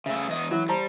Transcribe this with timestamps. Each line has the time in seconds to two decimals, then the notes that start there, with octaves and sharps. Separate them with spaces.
0.06 C#3 A3 E5
0.29 E2 D#5
0.51 E3 F#3 E4
0.69 G3 C5 A5 A#5